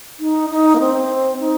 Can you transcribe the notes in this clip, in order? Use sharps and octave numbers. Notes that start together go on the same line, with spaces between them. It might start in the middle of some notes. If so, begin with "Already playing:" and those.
D#4
D#4
A#3
C4
D#4